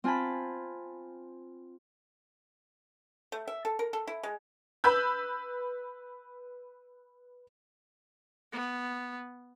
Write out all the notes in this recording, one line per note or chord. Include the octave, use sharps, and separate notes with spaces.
C4 F4 G#5 A5 B5
A3
E5
A4
A#4
A4
E4
G#3
B4 B5 E6 G6
B3